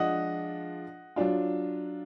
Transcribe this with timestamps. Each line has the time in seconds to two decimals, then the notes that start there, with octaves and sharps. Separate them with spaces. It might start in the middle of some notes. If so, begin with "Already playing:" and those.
Already playing: F3 G#3 D4 F4 D#5 F#5
1.16 F#3 D4 F4